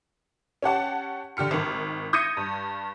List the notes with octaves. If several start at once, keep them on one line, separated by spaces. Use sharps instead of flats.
C#4 G4 F#5 A5
D3 G4 F6 C#7
G#1 D#3
D#6 G6 G#6 A#6 C#7 D#7
G2